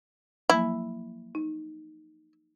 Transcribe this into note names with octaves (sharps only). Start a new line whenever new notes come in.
F3 F#3 A#3 E4
D#4